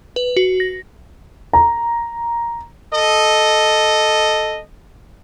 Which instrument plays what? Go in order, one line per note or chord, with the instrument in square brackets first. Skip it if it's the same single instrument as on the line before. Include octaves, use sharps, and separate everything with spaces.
[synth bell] B4
F#4
A#6
[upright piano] A#5
[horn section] A4 D#5